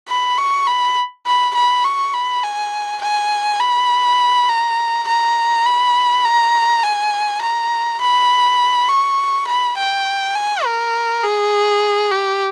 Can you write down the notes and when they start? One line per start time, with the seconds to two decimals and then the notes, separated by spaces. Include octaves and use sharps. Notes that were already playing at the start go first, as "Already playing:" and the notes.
0.08 B5
0.37 C#6
0.67 B5
1.26 B5
1.55 B5
1.84 C#6
2.14 B5
2.43 G#5
3.02 G#5
3.60 B5
4.49 A#5
5.08 A#5
5.66 B5
6.25 A#5
6.83 G#5
7.41 A#5
8.01 B5
8.89 C#6
9.47 B5
9.77 G5
10.35 G#5
10.64 A#4
11.23 G#4
12.11 G4